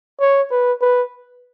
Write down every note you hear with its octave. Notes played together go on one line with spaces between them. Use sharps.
C#5
B4
B4